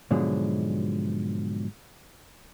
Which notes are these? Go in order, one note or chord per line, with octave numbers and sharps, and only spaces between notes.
G#2 B2 D3 F3 F#3 G#3